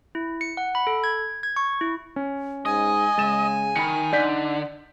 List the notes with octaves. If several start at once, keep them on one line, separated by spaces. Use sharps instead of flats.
E4
C#7
F#5
B5
A4
G#6
G#6
C#6
E4
C#4
G#2 D#5 G#5
C#3 G#3 A6 E7
D#3 B5 C#7
D3 D#4 D5 G6 B6